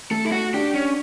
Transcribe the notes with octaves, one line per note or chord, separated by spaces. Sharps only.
A3 A4
E4
F#4
D4 G4
C#4